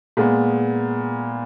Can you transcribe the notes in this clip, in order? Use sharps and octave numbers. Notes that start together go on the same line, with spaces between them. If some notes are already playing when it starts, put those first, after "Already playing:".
A#2 G#3 B3